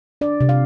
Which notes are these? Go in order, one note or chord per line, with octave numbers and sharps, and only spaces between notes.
D4 D5
C3
F5